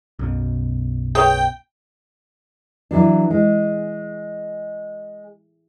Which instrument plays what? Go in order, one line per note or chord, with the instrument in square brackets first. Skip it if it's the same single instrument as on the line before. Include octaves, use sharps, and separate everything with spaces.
[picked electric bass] B1 F#2 B2
[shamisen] G#4 B4 C#5 [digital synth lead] G5
[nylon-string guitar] E3 F#3 D4
G#3